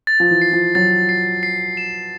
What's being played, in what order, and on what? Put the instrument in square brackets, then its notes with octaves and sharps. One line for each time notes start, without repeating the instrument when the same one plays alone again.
[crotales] A6
[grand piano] F3
E3
[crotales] C7
[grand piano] F3
[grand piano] F#3 [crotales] A6
[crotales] C7
C7
E7